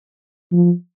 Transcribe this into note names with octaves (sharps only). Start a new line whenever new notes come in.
F3